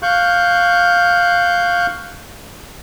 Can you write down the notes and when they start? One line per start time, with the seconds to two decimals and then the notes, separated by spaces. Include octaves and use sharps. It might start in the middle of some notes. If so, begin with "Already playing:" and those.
0.03 F5 C#6 F#6 G6